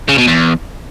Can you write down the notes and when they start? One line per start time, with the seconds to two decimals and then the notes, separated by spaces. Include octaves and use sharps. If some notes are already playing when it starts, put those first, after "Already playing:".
0.09 C#3
0.18 B2
0.28 E2